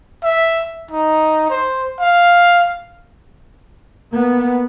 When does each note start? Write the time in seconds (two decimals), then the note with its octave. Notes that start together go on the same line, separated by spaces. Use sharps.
0.23 E5
0.91 D#4
1.50 C5
2.00 F5
4.12 A#3 B3